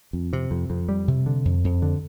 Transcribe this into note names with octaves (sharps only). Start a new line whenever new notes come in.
F2
C3
F2
F2
G3
C3
D3
F2
F2
D3